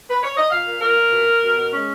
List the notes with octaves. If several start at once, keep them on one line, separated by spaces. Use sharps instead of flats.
B4
C#5
D#5
A#2 F5
A#2
A#2 A#4
A#2
B2
A#3
B2
B2
G#3 C#4